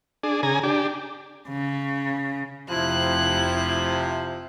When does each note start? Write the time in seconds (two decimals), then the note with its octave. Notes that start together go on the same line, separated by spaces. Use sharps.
0.23 D4 G#4
0.43 C#3 G#4 G#5 A#5
0.63 D4 G4
1.48 C#3
2.69 F1 C3 F3 E4 F#6